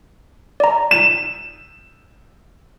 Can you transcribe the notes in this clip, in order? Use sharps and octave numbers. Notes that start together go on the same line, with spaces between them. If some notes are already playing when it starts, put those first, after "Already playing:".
D5 A#5
E7